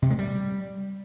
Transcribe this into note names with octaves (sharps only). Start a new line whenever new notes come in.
C3
G#3
G3